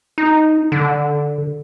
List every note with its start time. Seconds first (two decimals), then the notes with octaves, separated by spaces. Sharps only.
0.18 D#4
0.72 D3